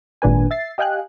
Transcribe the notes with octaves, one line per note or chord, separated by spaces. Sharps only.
G#1 A#2 D4 B4 G#5
E5 A6 C7
G4 D#5 F5 G5 G#5 F#6